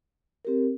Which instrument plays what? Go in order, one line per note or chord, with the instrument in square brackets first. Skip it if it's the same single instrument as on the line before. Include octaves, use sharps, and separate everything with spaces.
[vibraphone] C4 G4 A#4